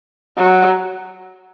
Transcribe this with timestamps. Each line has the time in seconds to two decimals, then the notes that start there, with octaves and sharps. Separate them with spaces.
0.37 F#3